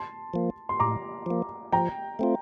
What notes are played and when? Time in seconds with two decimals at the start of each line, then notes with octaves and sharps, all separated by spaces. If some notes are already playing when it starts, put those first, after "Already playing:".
Already playing: A5 C6
0.34 F3 A#3
0.69 C6
0.80 A2 A#5 D6
1.26 F3 A#3
1.72 F3 G5 A#5
2.19 A3 C4 F4